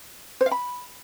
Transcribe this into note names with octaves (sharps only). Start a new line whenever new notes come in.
C5
F5
B5